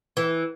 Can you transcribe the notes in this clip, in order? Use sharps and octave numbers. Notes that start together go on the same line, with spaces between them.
E3